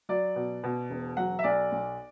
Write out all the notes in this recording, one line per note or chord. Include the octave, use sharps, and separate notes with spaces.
F#3 D5
B2
B2
E1
F#3 F#5
E5
B1 D5
B1